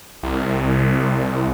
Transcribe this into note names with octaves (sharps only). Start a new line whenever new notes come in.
C2